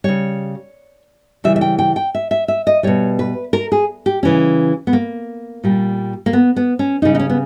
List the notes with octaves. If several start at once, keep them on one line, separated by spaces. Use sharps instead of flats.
C#3 G3 C#5
C#3 E3 G3 E5
E5
G5
G5
G5
E5
E5
E5
D#5
B2 G3 C#5
B4
A#4
G#4
G4
C#3 E3 G3 C#4
B3
A#3
A#2 G3
A#3
B3
B3
C#4
C#3 G3 D#4
D#4
C#4
B3